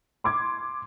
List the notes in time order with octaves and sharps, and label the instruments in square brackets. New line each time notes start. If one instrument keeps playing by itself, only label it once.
[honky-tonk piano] C6 D6 G#6